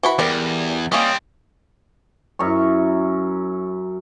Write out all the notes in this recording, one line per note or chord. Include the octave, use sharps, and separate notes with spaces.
E3 F#4 B5
E2 G3 A#4
G3 A#3 C4 C#4 D#5
F#2 E4 C#6